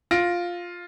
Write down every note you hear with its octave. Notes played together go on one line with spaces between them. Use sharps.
F4 A#6 D7